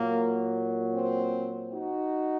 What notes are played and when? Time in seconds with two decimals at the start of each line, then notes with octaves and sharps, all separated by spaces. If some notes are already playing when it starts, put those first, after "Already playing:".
Already playing: A#2 F#3 A#3
0.94 C4
1.73 D#4 F#4